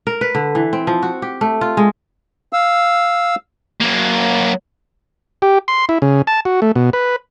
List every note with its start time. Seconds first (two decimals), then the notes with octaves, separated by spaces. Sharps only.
0.07 A#4
0.21 B4
0.35 D3
0.55 E3
0.73 C4
0.87 F3
1.03 F#4
1.22 G4
1.41 A3
1.61 F4
1.77 G#3
2.53 F5 E6
3.81 F#3 A#3
5.42 G4
5.68 C6
5.89 E4
6.02 C#3
6.27 A5
6.45 F#4
6.62 A3
6.75 B2
6.93 B4